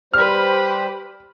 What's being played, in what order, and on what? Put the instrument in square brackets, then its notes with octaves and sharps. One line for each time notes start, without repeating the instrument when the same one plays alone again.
[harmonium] G3 C5 [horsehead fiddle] G4 B4 [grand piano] F6